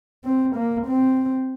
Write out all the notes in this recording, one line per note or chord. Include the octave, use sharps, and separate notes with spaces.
C4
A#3
C4